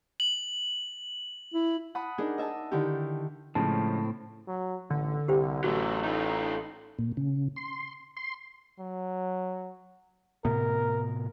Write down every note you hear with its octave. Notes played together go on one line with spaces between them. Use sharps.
F#7
E4
F#5 A5 B5 D#6 F#6
D4 D#4 G#4 A#4
D#5 E5 A5
D3 D#3 D#4 E4 G4
A2 C#3 F3 G#3 C4 A5
F#3
A1 D3
C2 G4 C5 G5
A1 F#3 A3 F#4 C6
A3 D#4 F4
A#2
C#3
C6
C6
F#3
A2 C3 B3 A#4